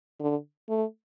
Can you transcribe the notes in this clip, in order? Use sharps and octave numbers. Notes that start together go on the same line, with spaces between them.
D3
A3